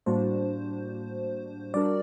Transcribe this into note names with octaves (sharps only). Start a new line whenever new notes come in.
A2 G3 A#3 D4 F#4 C5
G3 D4 F#4 A#4 D5